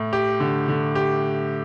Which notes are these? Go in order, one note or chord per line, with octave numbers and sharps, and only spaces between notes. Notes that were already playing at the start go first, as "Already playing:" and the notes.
Already playing: A2
G4
D3
D3
G4